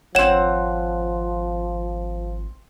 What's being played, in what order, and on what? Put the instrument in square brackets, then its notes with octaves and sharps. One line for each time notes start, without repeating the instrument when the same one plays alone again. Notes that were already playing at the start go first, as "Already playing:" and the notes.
[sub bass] G#1 [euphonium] F3 [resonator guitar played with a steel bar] C4 F#5 [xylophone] C#5 E7